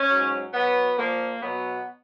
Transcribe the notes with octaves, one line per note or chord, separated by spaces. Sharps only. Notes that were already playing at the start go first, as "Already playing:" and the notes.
Already playing: C#4
G#2 F#3
B2 F#3 B3
A#2 F3 A#3
B2 F#3 B3